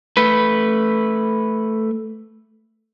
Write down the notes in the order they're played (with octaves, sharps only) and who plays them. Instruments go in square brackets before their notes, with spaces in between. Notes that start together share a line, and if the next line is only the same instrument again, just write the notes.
[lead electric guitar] A3 B4